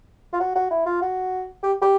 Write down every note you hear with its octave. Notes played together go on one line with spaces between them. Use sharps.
F4
F#4
F#4
E4
F4
F#4
G4
G4